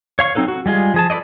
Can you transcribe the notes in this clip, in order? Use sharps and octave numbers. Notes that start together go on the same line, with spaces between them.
C#5 F5 C#6
F#3 C4 D#4 A4 B4
F#4
G3 G#3 F4 G#4
F3 G#4 A5
A4 B4 C5 D5 D#5